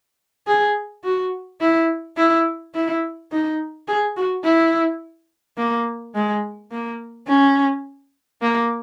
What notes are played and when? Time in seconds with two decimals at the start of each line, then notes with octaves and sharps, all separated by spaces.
0.47 G#4
1.04 F#4
1.61 E4
2.17 E4
2.75 E4
3.31 D#4
3.88 G#4
4.16 F#4
4.44 E4
5.57 A#3
6.15 G#3
6.71 A#3
7.28 C#4
8.42 A#3